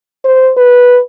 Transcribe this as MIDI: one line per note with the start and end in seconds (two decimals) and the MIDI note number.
0.25 0.52 72
0.57 1.00 71